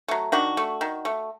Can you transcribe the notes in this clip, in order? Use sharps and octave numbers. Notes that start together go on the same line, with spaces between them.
F#3 A3
D#3 D4 F#4
A3
D#3
A3